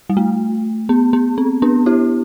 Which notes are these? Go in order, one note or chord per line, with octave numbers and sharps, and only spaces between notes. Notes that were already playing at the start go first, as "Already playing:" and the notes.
G3
A3
B3
B3
C4
B3 D4
E4 G4